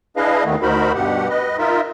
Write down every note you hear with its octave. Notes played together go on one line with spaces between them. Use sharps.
D4 E4 G#4 B4 D#5 F5
D#2 D#3 A3 B3
D2 D#4 F#4 A#4 C5 B5
G2 B2 G4 F#5
B4 D#5
D#4 F4 A#4 E5